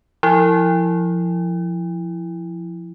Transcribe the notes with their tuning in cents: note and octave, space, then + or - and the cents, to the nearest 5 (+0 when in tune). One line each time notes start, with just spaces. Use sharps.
F3 -5 E4 +0